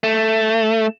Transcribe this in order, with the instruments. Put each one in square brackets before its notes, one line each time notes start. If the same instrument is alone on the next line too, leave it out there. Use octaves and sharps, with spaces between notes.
[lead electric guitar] A3